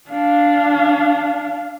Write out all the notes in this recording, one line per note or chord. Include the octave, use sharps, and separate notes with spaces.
D4 F5